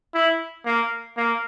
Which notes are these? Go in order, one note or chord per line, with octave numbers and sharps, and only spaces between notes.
E4
A#3
A#3